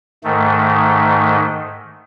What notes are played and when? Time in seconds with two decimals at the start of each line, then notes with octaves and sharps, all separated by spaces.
0.24 G#2 D#3 A3